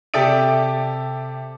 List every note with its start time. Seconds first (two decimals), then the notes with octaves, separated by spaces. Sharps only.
0.14 C3 G4 A4 D5 E5 D7